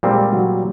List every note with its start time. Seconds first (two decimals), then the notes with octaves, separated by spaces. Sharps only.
0.03 A#2 G3 G#3 C4
0.32 F#3